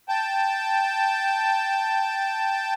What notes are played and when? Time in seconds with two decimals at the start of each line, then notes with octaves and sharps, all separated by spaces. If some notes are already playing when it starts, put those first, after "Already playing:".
0.09 G5 A5